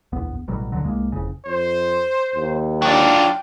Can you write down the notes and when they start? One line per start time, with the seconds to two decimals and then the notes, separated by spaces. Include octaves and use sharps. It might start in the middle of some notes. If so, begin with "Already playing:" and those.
0.12 D1 A#1 E2 B3
0.48 A1 B2 F#3 G3
0.72 D#2 B2 D3 F#3
0.84 C2 G#3 A#3
1.12 F#1 F2 C#3
1.46 F2 C5
2.34 D#2
2.82 F#3 D4 F4 G5